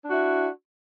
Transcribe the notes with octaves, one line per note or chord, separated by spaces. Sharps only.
D4 E4 F#4